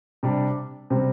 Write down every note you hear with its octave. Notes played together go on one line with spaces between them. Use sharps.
C3 G3 D4
C3 G3 C4